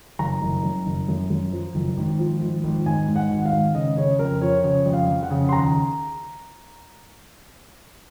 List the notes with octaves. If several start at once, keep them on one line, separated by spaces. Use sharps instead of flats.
F#1 A#5
F#1
F#2
F#1
F#2
F#2
F3
F#1
G#1
F3
G#1
G#1
G#2 G#5
G#2
F#5
G#1
F5
G#1
C#3 D#5
C#3 C#5
F2 A#4
F3 C#5
C#3 C#5
F2
F5
F2
F#5
C#3
C6
D#2 A#5